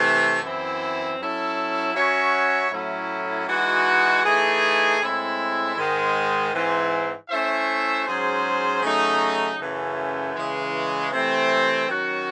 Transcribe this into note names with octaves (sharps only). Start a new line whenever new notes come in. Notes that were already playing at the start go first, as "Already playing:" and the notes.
Already playing: C3 E3 A3
F#2 E3 C4 E4
F#3 C#4 E4 A4
F#3 C#4 F#4 C#5 E5
A2 F#3 A3 C#4 E4
E3 G#3 D#4 F#4
E3 A3 D#4 G#4
A2 G#3 C4 E4
G#2 D#3 G#3
G#2 E3 C4
A3 C#4 E4 C5 E5
G#2 F#3 C#4 G#4 C5
C#3 F#3 A3 D#4
F#2 C#3 E3 A3
C#3 E3 G#3
C3 E3 A3 C4
D#3 F#3 C#4 F#4